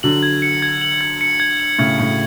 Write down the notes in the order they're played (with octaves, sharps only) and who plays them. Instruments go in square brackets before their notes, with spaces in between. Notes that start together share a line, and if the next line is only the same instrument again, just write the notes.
[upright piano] D3 F#3 [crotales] F#7
[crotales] G#6
C#7
G#6
F#7
G#6
C#7
G#6
F#7
[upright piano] A2 C#3 [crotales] G#6
[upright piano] A2 [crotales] C#7